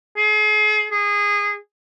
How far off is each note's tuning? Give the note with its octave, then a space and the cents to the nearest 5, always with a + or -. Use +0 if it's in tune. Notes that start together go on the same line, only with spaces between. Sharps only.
G#4 +40
G#4 -20